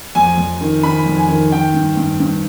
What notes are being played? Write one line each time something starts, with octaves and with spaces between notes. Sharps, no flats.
F2 G#5
F2
D#3
D#3 B5
F2
G#5
D#3
D#3 G5
G2
G2
G2